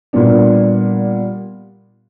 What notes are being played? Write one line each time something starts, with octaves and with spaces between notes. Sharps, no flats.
A#2 G3 B3 D4